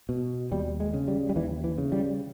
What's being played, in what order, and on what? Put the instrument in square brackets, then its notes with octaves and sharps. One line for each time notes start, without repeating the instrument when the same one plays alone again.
[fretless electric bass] B2
D#2 G3
G#3
C#3
G3
G3
D#2 E3
E3
C#3
G3